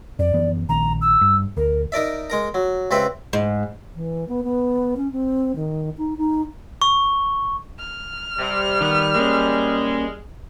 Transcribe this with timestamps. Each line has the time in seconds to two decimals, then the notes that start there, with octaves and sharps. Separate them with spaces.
0.19 F2 D5
0.33 F#2 E3 B3
0.69 A#1 D#3 A#5
1.01 E6
1.21 G2
1.57 D2 A#4
1.92 D#4 A#4 D5 E5
2.30 G#3 A#4 A#5
2.54 F#3
2.91 C#2 C4 G4 B4 E5
3.33 G#2
3.95 E3
4.28 B3
4.44 B3
4.97 C#4
5.12 C4
5.56 D#3
5.98 D#4
6.17 D#4
6.82 C#6
7.79 F6
8.39 C3 G3
8.81 D#3 B3
9.15 G#3 A#3 C#4